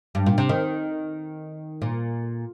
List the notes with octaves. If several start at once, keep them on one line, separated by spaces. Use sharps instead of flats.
G2
A#2
C3
D#3
A#2